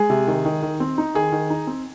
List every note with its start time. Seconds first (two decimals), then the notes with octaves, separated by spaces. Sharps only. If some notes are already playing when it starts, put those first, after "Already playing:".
Already playing: G#3 G#4
0.10 C3
0.27 D#3
0.45 D#3
0.63 D#3
0.80 C4
0.98 D#4
1.15 D#3 G#4
1.32 D#3
1.50 D#4
1.67 C4